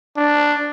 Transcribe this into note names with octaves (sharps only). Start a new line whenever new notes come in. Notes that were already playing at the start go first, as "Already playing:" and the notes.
D4